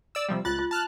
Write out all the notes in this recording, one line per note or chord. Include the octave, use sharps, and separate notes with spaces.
D5 E6
C3 F3 G3
C#2 F4 F#6 A6
F4
A5 F6 F#6